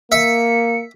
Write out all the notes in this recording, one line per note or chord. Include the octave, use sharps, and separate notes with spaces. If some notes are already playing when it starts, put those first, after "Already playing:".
A#3 E5 C#7